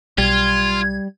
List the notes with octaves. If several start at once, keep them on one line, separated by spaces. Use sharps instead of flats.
B1 G3 F4 G#6